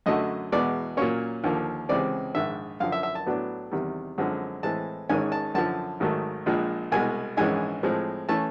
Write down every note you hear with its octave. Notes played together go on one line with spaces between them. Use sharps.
F#2 D3 F#3 A3 D#5
E2 B2 G#3 B3 D5
A#2 F#3 A#3 C#4 C#5
D#2 D3 F3 A#3
C#2 C3 E3 G#3 C4 D5
A#1 G#2 D#3 E5
F#2 D3 F3 F5
E5
E5
A5
A2 F#3 B3 D4
E2 C3 D#3 G3
F#2 D3 F3 G#3 C4
A2 E3 G#3 C4 A5
G#1 G#2 D#3 G#3 C#4 G#5
A5
F#2 D3 F3 A5
G#1 G#2 D#3 F#3 A3
A#1 A#2 F3 G#3
C2 B2 G#3 G#5
A#1 G#2 E3 G#3 C#4 G#5
A2 F3 G#3 C4
E3 A3 C#4 A5